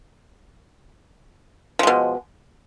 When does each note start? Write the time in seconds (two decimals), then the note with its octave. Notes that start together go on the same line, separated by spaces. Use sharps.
1.79 F3
1.83 G#3
1.87 B2